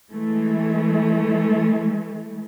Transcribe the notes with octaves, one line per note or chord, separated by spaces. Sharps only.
E3 G#3 A3